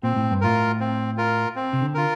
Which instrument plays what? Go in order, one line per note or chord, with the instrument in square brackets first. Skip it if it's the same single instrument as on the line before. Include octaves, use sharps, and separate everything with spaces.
[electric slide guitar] A#2 [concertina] C4
[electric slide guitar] A2
G2
[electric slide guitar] A2 [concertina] F4 A#4
[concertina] C4
F4 A#4
C4
[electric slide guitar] C3
D3
[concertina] F4 A#4